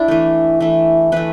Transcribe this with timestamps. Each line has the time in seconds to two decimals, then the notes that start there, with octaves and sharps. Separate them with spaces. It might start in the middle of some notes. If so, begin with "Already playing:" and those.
Already playing: D4 E4
0.08 E3 A3
0.60 E3 A3
1.12 E3 A3 B4